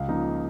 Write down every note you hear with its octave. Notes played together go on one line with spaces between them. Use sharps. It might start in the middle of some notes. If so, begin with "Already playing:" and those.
Already playing: C#2 F5
C#3 F3 A#3 D#4